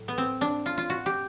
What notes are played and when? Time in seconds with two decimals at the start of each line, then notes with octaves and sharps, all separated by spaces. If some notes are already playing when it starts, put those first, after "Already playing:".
Already playing: A2 F#3
0.08 B3
0.18 C4
0.41 D4
0.66 F4
0.78 F4
0.90 F#4
1.06 G4